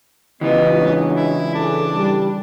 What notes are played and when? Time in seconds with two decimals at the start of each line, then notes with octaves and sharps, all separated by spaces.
0.41 C#3 E3 B3 F4 G4 D#5
0.73 F#3 G#3 D4
1.16 E4
1.54 F#3 D4 G#4 A4
1.94 G3